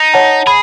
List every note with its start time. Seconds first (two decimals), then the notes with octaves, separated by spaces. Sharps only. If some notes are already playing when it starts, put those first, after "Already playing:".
Already playing: D#4
0.14 C#5 F#5 A5
0.47 G#4 B5